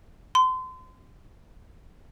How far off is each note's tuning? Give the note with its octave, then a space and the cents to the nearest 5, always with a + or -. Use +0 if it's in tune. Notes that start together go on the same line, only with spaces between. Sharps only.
C6 -35